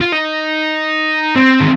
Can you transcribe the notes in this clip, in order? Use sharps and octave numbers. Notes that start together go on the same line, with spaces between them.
F4
D#4
C4
D#3